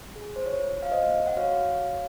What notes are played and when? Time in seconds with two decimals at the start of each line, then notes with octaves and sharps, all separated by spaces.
0.16 G#4
0.36 C5
0.46 F4 C#5
0.76 F4
0.83 F5
0.91 C5 D#5
1.07 A#3
1.27 F#5
1.37 F#4 C#5 F5